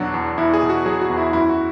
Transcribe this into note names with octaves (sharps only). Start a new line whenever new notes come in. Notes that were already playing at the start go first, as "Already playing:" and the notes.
Already playing: E2 B2 F#3 D4 F#4
E2
E2 E4
G#4
B2
F#4
F#3 G#4
F#4
E2
E4
F#2 E4
F#4